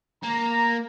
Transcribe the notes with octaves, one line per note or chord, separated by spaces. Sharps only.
A#3 A#5